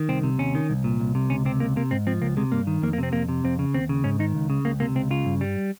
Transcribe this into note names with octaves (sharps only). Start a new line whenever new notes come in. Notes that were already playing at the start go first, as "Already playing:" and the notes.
Already playing: D#3
C2 C4
C3
D#2 C#4
D#3
C2
A#2
C2
C3
C#2 C#4
C3 C4
C#2 A#3
C3 A#3
G#2 C4
F3 C4
C#2 A#3
C3 G#3
G2 A#3
D#3
F2 A#3
A#3
C3 C4
F2 A#3
C3
F2 C4
C#3
D#2 C4
C#3
G#2 C#4
D#3 D#4
C#2
C#3
C#2 A#3
C3 A#3
C#2 C4
C#3 F4
G2
G3